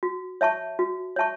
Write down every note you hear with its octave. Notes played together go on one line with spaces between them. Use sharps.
F#4
C#5 E5 A5 C#6
F#4
C#5 E5 A5 C#6